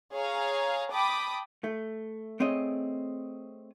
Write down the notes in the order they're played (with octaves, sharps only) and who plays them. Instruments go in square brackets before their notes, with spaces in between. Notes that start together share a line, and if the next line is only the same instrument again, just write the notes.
[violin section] G#4 C#5 F5 A#5
G5 A5 B5 D6 D#6
[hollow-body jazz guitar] A3
A3 C4 G#4 C#5 D#5